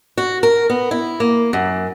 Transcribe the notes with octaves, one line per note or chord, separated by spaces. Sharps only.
F#4
A#4
B3
E4
A#3
F#2